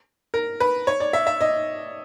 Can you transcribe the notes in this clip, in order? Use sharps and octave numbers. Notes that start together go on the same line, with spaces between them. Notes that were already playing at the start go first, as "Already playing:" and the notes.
A#4
B4
C#5
D5
E5
E5
D#5